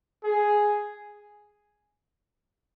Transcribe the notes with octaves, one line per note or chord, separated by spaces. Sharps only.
G#4